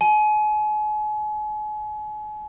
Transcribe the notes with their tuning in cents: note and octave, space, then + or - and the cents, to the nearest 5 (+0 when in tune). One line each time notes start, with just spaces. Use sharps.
G#5 +40